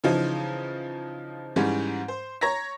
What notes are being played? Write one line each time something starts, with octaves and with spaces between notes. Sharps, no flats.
C#3 E3 F3 D#4
G#2 E3 G3 G#3 C#4
C5
C#5 A#5 C#6 G#6 A#6